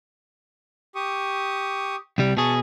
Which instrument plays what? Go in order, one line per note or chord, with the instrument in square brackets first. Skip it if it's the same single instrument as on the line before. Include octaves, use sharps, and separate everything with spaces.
[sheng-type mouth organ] G4 C#6 D#6
[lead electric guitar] C2 G3 [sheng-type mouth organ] G5
[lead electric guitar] B2 G#4 [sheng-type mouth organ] A5 C#6